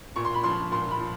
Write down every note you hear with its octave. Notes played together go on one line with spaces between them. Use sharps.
A#2 C#6
C6
B5
F3 C6
A#2 C6
B5
F3